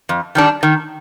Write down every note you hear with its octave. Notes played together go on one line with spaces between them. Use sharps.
F2
D#3 G3 D4
D#3